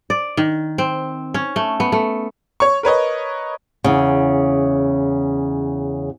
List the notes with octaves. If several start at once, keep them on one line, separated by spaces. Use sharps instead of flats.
D5
D#3
C4
C#4
A3
B3
A3
C#5 C#6
A#4 B4 C#5 D#5
E2 C#3